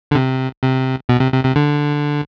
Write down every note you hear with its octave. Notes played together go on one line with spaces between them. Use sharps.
D3
C3
C3
B2
C3
C3
C3
D3